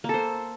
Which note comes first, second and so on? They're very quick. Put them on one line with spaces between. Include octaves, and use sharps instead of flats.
A#3 A4 C5